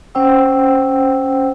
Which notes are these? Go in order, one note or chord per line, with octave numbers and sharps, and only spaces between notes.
C#4 C5 F#5 G5 E6